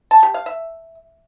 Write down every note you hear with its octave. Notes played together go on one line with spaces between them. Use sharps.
A5
G4
F5
E5